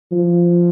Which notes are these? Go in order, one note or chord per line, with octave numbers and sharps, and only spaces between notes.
F3